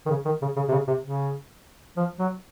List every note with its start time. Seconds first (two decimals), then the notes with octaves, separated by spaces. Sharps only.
0.06 D#3
0.10 C#3
0.25 D#3
0.42 C#3
0.56 C#3
0.68 C3
0.72 C#3
0.88 C3
1.04 C#3
1.97 F3
2.19 F#3